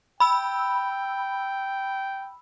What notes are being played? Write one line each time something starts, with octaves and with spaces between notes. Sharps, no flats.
G5 B5 E6